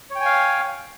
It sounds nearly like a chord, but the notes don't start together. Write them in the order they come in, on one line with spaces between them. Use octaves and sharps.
C#5 G5 G#5 F5